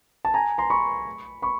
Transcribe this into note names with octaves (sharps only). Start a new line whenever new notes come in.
A5
G#5 A#5
A#5 C6
B5 C#6
B5 C#6